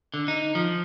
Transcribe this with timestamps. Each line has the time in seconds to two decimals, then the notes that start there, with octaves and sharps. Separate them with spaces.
0.14 D3
0.28 D#4
0.55 F3